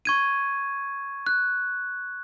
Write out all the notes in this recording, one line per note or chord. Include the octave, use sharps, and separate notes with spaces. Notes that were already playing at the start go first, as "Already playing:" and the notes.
C#6 G#6 D#7
F#6